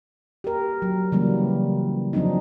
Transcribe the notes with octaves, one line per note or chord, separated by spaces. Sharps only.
G4 A#4
F#3
C#3 E3 F#3 G3 A#3
F3 F#3 C4 D4 D#4